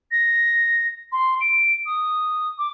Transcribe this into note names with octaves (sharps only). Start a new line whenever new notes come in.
A#6
C6
D7
D#6
D6